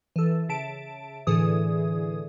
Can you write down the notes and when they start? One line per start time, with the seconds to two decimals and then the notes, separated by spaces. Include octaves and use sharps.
0.16 E3 A4
0.49 C#3 E5 A5 D7
1.27 A2 D3 E3 G#4 D#6